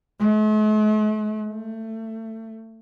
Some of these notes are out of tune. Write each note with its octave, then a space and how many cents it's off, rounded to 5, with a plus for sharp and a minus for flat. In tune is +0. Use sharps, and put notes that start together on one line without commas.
A3 -45
A3 +25